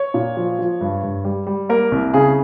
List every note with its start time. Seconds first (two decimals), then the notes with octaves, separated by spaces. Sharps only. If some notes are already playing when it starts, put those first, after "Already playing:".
Already playing: C#5
0.14 A#2
0.37 F3
0.59 F3
0.81 G2
1.03 G2
1.24 G3
1.47 G3
1.69 A#3 A#4
1.92 C2
2.14 C#3 G#4